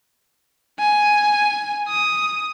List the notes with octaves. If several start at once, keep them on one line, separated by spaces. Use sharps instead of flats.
G#5
D#6